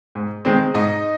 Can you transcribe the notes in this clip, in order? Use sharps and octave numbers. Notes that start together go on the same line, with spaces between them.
G#2
D#3 G#3 C4
G#2 D#4 D#5